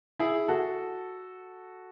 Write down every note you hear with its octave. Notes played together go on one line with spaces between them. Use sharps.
E4 G#4
F#4 A4